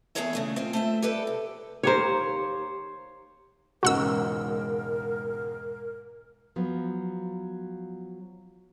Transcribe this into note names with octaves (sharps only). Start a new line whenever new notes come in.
E2 G2 G#4 A4 C#5 E5
C#3 A3 D4
C4 F4
A3 C5 E5
G4 A4 B4 D5
C3
D#2 G4 A#4 C5 C#5
E1 C#2 G#2 F#4 A#4 F#5 E6
F3 F#3 B3